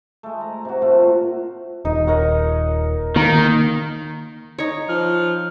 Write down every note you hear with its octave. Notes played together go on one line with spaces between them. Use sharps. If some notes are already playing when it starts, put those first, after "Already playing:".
G#3 A3
A#5
C3 F#4
A#2 A3 F4 F#4
D#1 D#4
A#4 C#5 F#5
D#3 A#3
D#4 C#5
F3 F6